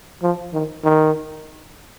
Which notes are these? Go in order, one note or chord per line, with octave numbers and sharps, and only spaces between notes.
F3
D#3
D#3